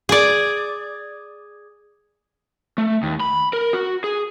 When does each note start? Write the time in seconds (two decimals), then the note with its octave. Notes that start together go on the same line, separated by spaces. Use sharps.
0.09 G#4 D5
2.78 A3
3.03 D#2
3.20 B5
3.53 A#4
3.73 F#4
4.04 G#4